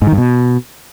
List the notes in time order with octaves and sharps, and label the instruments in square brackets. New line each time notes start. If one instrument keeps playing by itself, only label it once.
[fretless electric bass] G#2
D#3
G2
B2